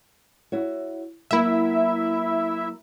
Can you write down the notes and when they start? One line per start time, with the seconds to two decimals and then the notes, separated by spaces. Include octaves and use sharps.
0.52 E4 F#4 C#5
1.31 F#3 A#3 B3 E4 E5